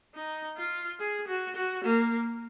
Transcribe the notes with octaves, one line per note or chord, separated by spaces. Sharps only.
D#4
F4
G#4
F#4
F#4
A#3